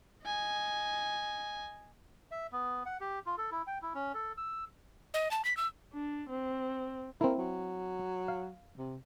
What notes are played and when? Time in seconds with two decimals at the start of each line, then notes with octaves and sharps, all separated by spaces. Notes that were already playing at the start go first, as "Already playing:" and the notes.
0.25 D#5 G#5
2.31 E5
2.52 B3
2.86 F#5
3.01 G4
3.26 F4
3.38 A4
3.51 E4
3.67 G5
3.82 E4
3.94 C#4
4.14 A4
4.37 E6
5.14 D#5
5.31 A5
5.45 B6
5.57 E6
5.93 D4
6.29 C4
7.21 A#3 C4 E4
7.38 F#3
8.28 F5
8.78 C3